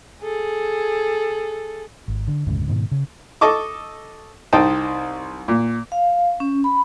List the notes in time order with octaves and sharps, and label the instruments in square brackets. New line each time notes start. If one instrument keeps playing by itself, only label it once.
[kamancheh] G#4 A4
[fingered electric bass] G#1
D3
F1 D2 G#2 C#3
G#2 B2 D#3
C#3
[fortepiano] A4 D#5 A5 C#6 D6
C2 D#4 C5 D#5 G5 A5
A#2
[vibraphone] F5
C#4
B5